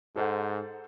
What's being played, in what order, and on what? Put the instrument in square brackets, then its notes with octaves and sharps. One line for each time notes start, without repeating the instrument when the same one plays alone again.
[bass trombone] G#2 [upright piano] A4 C5 F#5